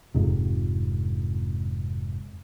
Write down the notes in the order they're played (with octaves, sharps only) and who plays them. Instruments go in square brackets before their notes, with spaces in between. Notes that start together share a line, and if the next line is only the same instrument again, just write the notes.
[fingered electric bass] F1 F2 G#2 C3